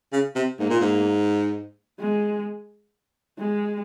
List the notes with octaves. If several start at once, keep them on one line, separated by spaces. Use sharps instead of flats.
C#3
C3
G#2 A#3
A#2
G#2
G#3
G#3